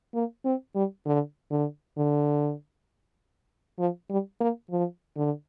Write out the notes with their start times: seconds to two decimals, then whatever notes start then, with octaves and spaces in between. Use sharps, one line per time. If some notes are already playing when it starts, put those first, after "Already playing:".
0.14 A#3
0.45 C4
0.75 G3
1.06 D3
1.51 D3
1.97 D3
3.79 F3
4.10 G3
4.40 A#3
4.70 F3
5.17 D3